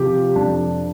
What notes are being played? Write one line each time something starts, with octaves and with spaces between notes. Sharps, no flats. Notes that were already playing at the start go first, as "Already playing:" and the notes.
Already playing: C3 F3 G4
F2 D4